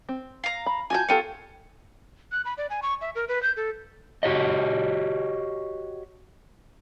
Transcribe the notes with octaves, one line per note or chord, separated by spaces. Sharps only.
C4
F5 A#5
B5
F4 F#4 G#5 A5 G6
B3 F4 G4 A4 C#5
F#6
B5
D5
G#5
C#6
E5
A#4
B4
G6
A4
F#4 G4 C#5 D#5